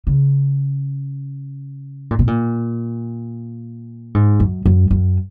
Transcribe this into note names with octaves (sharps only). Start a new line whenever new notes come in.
C#3
A#2
B2
A#2
G#2
F#2
F#2
F#2